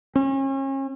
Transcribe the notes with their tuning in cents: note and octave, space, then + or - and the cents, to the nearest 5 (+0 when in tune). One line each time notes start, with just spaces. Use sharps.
C#4 -35